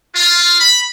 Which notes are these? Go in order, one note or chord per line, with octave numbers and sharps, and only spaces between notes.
F4
B5